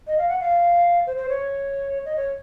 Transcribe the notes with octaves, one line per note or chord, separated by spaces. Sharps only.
D#5
F5
F#5
F5
C5
C5
C#5
D#5
C#5